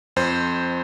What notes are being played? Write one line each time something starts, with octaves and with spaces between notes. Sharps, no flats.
F2 C5